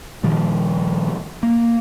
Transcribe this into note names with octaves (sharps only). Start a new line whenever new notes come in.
A#2 D#3 F3 G3
A#3